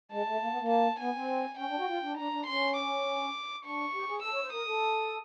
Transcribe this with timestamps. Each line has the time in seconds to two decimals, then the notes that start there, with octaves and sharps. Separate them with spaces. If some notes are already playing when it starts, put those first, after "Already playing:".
0.12 G#3 A5
0.27 A3
0.41 A#3
0.51 B3
0.60 A#3
0.70 A5
1.00 B3 G#5
1.15 C4
1.58 C#4 G5
1.69 D4
1.78 F#4
1.88 F4
2.03 D4
2.12 D#4
2.18 D4 A#5
2.32 D4
2.46 C#4 C6
2.76 D6
3.65 D4 C#6
3.94 G4
4.09 G#4
4.23 A4 E6
4.33 C#5
4.43 C5
4.53 A#4 D#6
4.67 A4